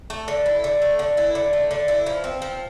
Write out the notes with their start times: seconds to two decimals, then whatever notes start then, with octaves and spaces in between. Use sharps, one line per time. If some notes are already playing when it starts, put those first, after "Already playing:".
0.10 A3
0.28 D3
0.46 E4
0.64 D3
0.82 A3
0.99 D3
1.17 E4
1.35 D3
1.53 A3
1.71 D3
1.88 E4
2.06 F3
2.24 C4
2.42 F3